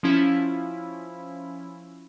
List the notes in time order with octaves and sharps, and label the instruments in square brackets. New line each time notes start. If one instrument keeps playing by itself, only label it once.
[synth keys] F3 C#4 E4 F4